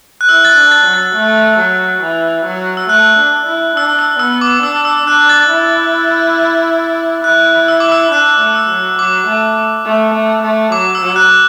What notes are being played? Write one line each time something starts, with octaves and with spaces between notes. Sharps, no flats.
F#6
E4 E6
A6
F#6
D4
A6
F#3
A6
A3
F#3
E3
F#3
E6
A3 F#6
D4
E4
D4 E6
E6
B3 E6
D6
D4 E6
E6
D4 F#6
A6
E4
E4 F#6
E6
D6
E6
D4 F#6
A3
E6
F#3
F#3 D6
A3
A3
A3
A3
F#3 D6
E6
F#3
F#6